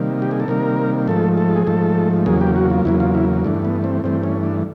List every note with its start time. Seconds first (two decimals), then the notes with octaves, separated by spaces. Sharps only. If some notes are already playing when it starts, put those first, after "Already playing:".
Already playing: C3 D#3 G3 A#3
0.22 G4
0.31 G#4
0.40 A4
0.48 C3 D#3 G3 A#3 A#4
1.07 G#2 F3 A3 A4
1.37 A4
1.56 G#4
1.67 G#2 F3 A3 A4
2.26 E2 C#3 F#3 A#3 G#4
2.41 G4
2.56 F#4
2.70 F4
2.85 E2 C#3 F#3 A#3 E4
3.00 F4
3.15 E4
3.44 G2 E3 A3 D4
3.65 B3
3.84 C4
4.04 G2 E3 A3 C4
4.23 C#4
4.43 D4